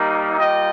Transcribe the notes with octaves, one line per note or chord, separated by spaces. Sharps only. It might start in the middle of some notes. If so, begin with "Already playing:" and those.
Already playing: G3 A#3 D#4
G3 A#3 F4 D#5 G5